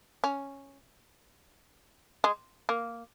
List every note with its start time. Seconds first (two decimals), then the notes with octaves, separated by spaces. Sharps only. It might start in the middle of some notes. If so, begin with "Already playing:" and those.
0.24 C#4
2.24 G#3
2.69 A#3